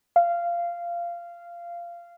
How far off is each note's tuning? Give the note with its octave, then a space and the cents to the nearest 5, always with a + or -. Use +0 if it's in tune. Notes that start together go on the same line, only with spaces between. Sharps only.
F5 -15